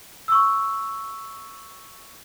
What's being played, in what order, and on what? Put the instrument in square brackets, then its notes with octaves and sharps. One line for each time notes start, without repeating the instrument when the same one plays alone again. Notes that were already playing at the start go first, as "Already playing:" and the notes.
[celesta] C#6 E6